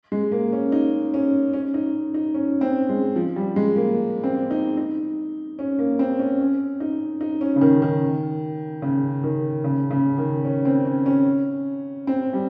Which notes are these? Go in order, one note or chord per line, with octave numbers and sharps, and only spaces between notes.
G#3
A#3
C#4
D#4
C#4
C#4
D#4
D#4
C#4
C4
G#3
F3
G3
G#3
A#3
C4
D#4
D#4
C#4
A#3
C4
C#4
C#4
D#4
D#4
C#4
C#3
D#3
D#3
C#3
D#3
C#3
C#3
D#3
C#4
C4
C#4
C#4
C4
G3